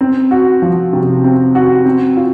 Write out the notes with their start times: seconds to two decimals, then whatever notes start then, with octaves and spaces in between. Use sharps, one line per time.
0.01 C4
0.31 F#4
0.62 F3
0.93 C3
1.24 C4
1.55 F#4
1.85 C4
2.17 F4